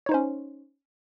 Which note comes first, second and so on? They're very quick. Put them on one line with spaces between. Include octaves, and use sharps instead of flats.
C#5 D#4 C5 C#4